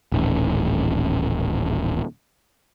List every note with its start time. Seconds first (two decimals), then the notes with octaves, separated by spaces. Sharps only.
0.12 D#1 A1